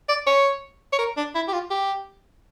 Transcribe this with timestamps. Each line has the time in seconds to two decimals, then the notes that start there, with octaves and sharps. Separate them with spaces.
0.09 D5
0.27 C#5
0.93 C#5
0.99 A#4
1.17 D4
1.35 E4
1.48 G4
1.53 F4
1.70 G4